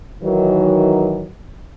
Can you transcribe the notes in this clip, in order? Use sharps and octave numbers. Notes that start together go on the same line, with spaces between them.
D#3 E3 F#3